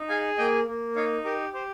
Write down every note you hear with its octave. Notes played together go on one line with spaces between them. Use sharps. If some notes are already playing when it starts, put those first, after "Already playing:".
Already playing: D#4
G#4 F5 G#5
A#3 D#5 G5
A#3
D#4 C#5 F5
G4 A#4
G4 C5